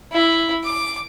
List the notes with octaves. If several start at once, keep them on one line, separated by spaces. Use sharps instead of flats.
E4
D6